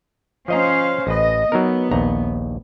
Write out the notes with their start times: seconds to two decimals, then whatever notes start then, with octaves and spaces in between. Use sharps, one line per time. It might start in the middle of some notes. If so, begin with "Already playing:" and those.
0.48 F3 C#4 C5 D#5 F5 A#5
1.07 A1 B4 D#5
1.52 F#3 B3 D#4 A#4
1.91 A#1 D#2 A#5